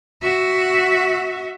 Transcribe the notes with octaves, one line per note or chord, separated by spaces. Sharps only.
F#4 E5